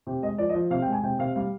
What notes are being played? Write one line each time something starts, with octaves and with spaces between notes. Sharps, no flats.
C3 G4
G#3 D#5
F3 D5
D#5
F3
C3 F5
G5
G#3
G#5
C3 G5
C3 F5
G3 F5